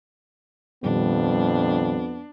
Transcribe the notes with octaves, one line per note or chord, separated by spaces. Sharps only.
F2 A#2 D#3 G3 B3 D4